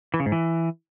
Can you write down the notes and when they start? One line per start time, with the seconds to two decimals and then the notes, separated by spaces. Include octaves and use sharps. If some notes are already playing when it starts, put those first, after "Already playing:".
0.14 E3
0.20 C#3
0.26 G#2
0.32 E3